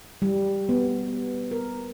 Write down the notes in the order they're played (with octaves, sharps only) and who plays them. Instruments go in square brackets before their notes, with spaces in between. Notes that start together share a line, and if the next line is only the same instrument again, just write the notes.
[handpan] G3
B3
A#4